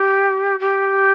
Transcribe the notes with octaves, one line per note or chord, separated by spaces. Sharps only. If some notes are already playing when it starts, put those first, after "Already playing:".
Already playing: G4
G4